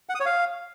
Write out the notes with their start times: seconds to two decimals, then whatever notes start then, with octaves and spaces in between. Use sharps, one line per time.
0.09 F#5
0.15 D#6
0.20 C#5
0.26 F5